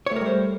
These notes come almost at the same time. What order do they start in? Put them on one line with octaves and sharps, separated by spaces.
C#5 A3 A#4 G3 C5